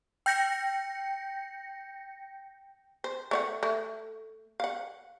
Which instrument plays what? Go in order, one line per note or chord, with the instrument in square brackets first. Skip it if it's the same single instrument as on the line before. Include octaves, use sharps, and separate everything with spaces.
[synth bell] G5 G6 A#6 C#7
[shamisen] C5
A3 C#5 F#5
A3
F5 F#5